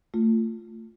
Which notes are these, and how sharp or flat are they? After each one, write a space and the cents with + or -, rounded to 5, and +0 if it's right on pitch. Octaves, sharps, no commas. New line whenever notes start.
A3 +25 F4 +0